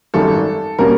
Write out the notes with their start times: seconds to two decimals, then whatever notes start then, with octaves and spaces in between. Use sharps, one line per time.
0.14 G#1 F#2 D#3 G3 A4
0.79 B2 G3 A#3 C#4 A#4